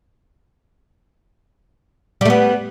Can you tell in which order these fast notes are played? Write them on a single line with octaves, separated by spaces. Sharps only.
G3 A3 B3